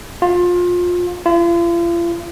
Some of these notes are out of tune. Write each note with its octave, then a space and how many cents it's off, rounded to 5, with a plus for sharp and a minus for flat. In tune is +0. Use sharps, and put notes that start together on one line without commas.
F4 +25
F4 -40